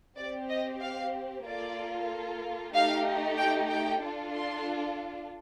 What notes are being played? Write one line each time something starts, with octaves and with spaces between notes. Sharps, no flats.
C4 G4 D5
D#5
F5
A#3 F4 A4 D5
A3 D#4 G4 F5
G5
G5
D4 F4 A4
C6